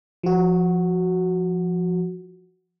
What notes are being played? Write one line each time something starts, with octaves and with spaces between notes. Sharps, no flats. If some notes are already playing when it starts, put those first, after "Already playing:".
F3 F#4